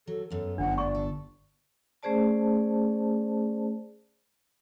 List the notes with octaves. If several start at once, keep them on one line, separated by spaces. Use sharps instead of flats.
F#3 A4
F#2 B3 A4
G1 D4 F#5
D5 C#6
A4
A3 C#4 G#4 C5 D5 A5